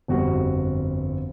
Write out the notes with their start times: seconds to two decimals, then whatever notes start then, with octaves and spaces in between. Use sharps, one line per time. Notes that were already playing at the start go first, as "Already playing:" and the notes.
0.08 G1 F2 G3 F#4